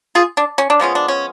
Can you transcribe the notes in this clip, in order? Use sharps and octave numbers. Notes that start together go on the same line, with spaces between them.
F4 G#4
D4
C#4
D4
F3 G#3 B3 C#4
D4
C#4